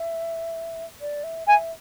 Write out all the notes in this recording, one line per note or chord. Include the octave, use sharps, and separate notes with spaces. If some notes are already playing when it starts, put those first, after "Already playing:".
Already playing: E5
D5
E5
E5 G#5